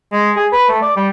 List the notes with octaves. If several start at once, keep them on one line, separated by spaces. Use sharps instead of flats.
G#3
G#4
B4
A3
D5
G3